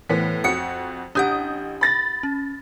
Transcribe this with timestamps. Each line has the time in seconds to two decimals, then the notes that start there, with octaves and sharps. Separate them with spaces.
0.09 A2 E3 B3 B6
0.44 F2 F#4 D#6 C#7
1.15 A1 D4 G4 F#5 D#6 G6
1.81 B5 A6 A#6
2.23 C#4